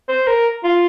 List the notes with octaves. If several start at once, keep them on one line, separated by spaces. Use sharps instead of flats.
C5
A#4
F4